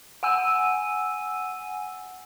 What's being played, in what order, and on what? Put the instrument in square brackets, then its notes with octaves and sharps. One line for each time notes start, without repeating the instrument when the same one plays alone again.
[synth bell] F#5 G#5 E6 D#7